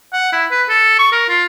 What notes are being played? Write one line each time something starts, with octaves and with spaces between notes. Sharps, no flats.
F#5
E4
B4
A4
C#6
A#4
F4